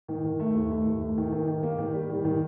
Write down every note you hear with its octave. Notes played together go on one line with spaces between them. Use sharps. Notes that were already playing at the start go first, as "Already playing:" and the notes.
D#3
D#3
A3
D#2
A3
D#2
A3
D#3
D#3
D#3
A#3
D#3
G3
D#3
D#3